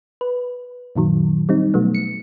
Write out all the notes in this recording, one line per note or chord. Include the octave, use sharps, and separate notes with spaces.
B4
F#2 A#2 D#3 F#3
G3 C4 D#4
B2 F#3 A3 B3
C#7